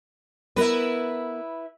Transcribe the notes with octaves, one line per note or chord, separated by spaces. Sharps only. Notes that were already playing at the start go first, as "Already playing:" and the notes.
B3 E4 A#4 B4